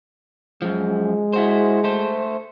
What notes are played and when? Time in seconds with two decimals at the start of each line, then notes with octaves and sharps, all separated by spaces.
0.62 F#2 F3 G#3
1.33 E4 F#4 C5
1.84 A3 C5